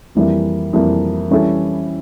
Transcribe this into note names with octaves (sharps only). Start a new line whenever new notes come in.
F2 E3 G3 A#3 E4
F2 E3 G3 A#3 E4
E3 G3 C#4 E4 A4